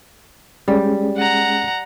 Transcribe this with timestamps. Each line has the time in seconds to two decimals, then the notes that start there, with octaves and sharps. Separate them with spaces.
0.68 G3 G#3 C#4 G#4
1.17 F#5 A#5